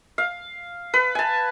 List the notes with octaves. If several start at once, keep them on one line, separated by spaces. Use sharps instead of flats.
F5
B4
G#5 A5